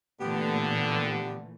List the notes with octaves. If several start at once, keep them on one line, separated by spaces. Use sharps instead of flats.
A#2 D3 E3 A3 B3 G4